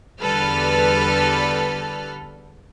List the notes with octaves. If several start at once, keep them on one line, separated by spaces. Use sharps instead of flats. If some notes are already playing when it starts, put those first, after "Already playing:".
E2 D3 G3 A4 B4 F6